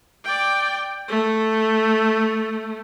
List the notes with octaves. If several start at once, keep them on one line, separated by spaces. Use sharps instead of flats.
D5 G5
A3